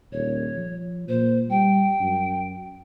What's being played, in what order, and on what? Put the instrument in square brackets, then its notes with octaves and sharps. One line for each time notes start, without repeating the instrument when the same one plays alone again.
[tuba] D#1 [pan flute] C#5
[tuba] F3
[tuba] A#2 [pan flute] C5
[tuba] G3 [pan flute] G5
[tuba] F#2